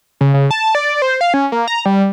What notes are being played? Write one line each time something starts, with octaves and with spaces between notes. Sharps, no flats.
C#3
C#3
A5
D5
C5
F5
C#4
A#3
A#5
G3